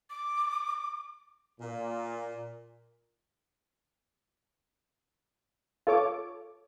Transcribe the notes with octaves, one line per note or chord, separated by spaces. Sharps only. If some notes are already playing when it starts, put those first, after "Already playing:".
D6
A#2
F4 A4 C#5 D6